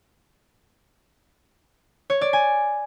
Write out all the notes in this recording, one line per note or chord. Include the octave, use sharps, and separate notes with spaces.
C#5
D5
G#5